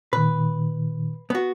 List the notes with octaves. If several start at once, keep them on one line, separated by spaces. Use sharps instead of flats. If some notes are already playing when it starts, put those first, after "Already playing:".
A#2 D#3 B4
B3 F#4